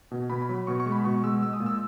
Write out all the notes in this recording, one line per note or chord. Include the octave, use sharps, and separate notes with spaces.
B2
B2 B5
B5
F#3
B5
B2 C#6
C#6
G#3
B5
B2 C#6
G#3 E6
G#3 E6
D#6
A#2
E6